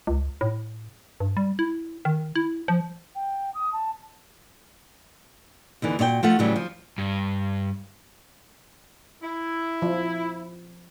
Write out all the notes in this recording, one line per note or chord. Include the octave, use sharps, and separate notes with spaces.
C#2
A2
G2
G3
E4
D#3
E4
F3
G5
D#6
A5
D#2 D3 E3
A#2 F#4 C#5 G5
F3 A3 F4 F#5
A2 C#3 E3 F#3 G3
F3
G2
E4
F3